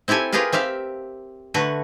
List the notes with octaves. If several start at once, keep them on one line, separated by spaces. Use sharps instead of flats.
C4 E4 G4 A4 G#5
F4 G4 G#4 A#4 B4 F5
C4 G4 E5 F5
D3 A3 F#4 B4